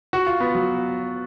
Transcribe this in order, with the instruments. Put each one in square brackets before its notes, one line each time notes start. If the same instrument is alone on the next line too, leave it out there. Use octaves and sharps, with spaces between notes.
[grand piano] F#4
F4
B3
F#3